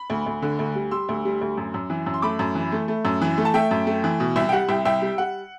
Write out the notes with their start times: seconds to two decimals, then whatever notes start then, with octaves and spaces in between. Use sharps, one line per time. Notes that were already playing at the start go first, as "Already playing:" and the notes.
Already playing: B5
0.10 D2
0.26 D2
0.42 D3
0.59 D2
0.75 G3
0.91 G3 C6 E6
1.09 D2
1.25 G3
1.41 D2
1.57 F#2
1.74 F#2
1.90 E3
2.06 F#2
2.14 C6
2.22 A3 B5 D6
2.39 F#2
2.55 E3
2.72 A3
2.88 A3
3.05 F#2
3.21 E3
3.38 A3
3.45 A5
3.54 A3 E5 G5
3.71 F#2
3.87 A3
4.04 E3
4.20 B2
4.36 C2 E5
4.49 G5
4.52 G3 F#5
4.69 C2 E5 G5
4.85 C2 E5 G5
5.02 G3
5.18 G3 F#5